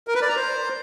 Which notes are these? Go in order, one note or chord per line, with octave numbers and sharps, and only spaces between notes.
A#4
B4
D5
A#5
C5